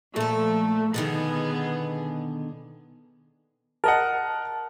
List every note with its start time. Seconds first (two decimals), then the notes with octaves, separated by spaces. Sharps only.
0.16 A#2 F3 A3 A4
0.94 B2 D3 D#3 B3 G#4
3.84 A#4 D#5 F#5 A5